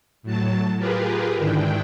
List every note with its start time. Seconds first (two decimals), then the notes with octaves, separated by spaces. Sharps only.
0.23 A2 F#3 A5
0.78 F4 G4 G#4 A#4 B4
1.36 G#2 D3 D#3 D4 E4 G5